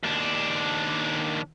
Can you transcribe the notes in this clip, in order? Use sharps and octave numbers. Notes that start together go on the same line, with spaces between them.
D#2 D4